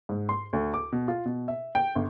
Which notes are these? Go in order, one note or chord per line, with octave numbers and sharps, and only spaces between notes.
G#2
C6
D2
D6
B2
F4
B2
E5
G5
G1